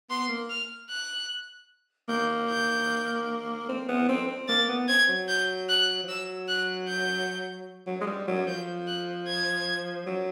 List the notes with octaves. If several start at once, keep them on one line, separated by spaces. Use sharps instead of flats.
B3 C6
A#3
F6
F#6
A#3 G6
G6
C4
B3
C4
C4
A#3 A6
B3
C4 G#6
F#3
G6
F#6
F3
F#3 E6
F#6
G6
F#3
G#3
G3
F#3
F3 G6
F#6
G#6
F#3